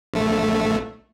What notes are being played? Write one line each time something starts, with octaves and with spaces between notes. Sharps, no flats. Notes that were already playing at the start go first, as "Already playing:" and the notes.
A#1 A3